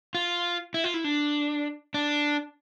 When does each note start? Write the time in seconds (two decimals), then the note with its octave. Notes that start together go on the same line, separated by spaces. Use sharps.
0.15 F4
0.74 E4
0.84 F4
0.94 E4
1.04 D4
1.94 D4